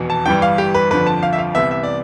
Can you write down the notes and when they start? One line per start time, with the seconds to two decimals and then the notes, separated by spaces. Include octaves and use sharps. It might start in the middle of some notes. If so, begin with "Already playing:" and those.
Already playing: F1 E2 B2
0.10 A5
0.26 G1 G2 E3 G3 G5
0.42 F5
0.58 G4
0.74 B4
0.90 G1 F2 D3 F3 B4
1.07 A5
1.23 F5
1.33 E5
1.38 F5
1.55 C2 C3 E3 B3 E5
1.71 E5
1.83 D5